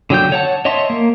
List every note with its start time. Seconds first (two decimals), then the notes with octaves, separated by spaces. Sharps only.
0.10 D3 F#3 G5 G6
0.32 C#5 F#5 A5
0.65 C#5 D#5 E5 A5 C6
0.90 A#3